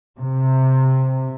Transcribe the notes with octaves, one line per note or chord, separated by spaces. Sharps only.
C3